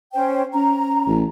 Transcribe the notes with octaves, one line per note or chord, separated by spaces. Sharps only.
C#4 C5 G5
C#4 A#5
A1